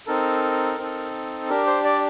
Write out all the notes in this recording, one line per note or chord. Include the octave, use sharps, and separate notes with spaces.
C4 D#4 A4 A#4
C4 D#4 A4
D4 G4 A#4
C5
D5